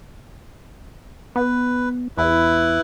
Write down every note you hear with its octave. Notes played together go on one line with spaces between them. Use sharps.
B3 B4
E2 E4 B4